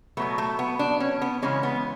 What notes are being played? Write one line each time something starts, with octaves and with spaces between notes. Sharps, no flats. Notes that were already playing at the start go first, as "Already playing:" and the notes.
B2 F#3 A3 B3
A3
B3
D4
C#4
B3
C#3 E3 G#3 C#4
B3